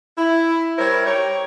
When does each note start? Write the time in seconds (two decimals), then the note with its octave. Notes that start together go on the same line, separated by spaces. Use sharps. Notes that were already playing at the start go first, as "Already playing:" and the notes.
0.18 E4
0.78 G3 E4 A#4 C5 C#5
1.07 D#4 G4 C#5